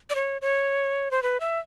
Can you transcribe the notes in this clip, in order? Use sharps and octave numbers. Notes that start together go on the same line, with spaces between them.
D5
C#5
C#5
C5
B4
E5